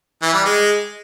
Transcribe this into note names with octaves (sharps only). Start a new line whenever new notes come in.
E3
G3
G#3